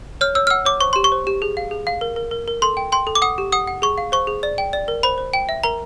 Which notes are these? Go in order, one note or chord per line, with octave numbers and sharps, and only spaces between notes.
C#5 F6
C#5 E6
F6
F#5 E6
C#5 D6
C5 C#6
G4 C6
C#6
C5
G4
G#4
F5
G#4
F5
A#4
A#4
A#4
A#4
A4 C6
G5
G5 C6
A4
D6
F#5 D#6
G4
F#5 D#6
F#5
G#4 C#6
F5
C5 C#6
G#4
D5
G5
D5
A#4
C5 B5
C5
G5
E5
A#4 A#5